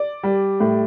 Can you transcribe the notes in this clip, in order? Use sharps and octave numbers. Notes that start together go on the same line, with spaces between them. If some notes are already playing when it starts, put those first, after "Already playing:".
Already playing: D5
G3
A2